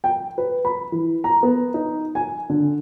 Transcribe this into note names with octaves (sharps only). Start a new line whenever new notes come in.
G5
B4
B5
E3
A#5
B3
D#4
G#5
D3